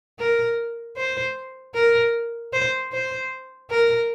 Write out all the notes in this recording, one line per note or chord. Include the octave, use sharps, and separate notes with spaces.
A#4
C5
A#4
C5
C5
A#4